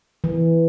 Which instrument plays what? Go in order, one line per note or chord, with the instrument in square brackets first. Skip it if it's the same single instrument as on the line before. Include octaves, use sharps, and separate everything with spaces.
[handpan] E3